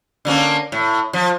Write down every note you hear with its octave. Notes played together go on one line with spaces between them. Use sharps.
D3 A#3 C#4
A2
F3